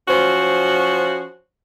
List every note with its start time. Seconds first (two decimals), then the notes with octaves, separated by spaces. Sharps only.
0.09 F3 C#4 F#4 C5